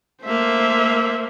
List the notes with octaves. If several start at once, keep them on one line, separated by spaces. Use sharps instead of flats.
A3 A#3 C5 E5